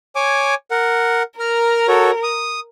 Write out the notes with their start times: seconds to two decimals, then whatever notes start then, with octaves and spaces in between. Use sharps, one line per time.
0.16 C#5 G#5 D6
0.71 A#4 F#5
1.40 A#4 A#5 F6
1.88 F#4 A4 C#5
2.23 D#6